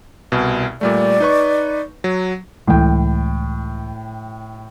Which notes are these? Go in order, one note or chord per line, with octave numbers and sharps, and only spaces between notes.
C2 B2
A#2 G3 A3 D5
D#4 B4 C#6
F#3
C#2 A2 E3 G#3 G5